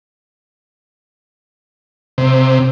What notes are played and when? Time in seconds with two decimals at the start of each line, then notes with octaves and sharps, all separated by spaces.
2.18 C3